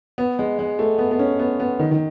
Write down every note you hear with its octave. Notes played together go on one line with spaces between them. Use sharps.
B3
G#3
G#3
A3
B3
B3
C#4
B3
B3
D#3
D#3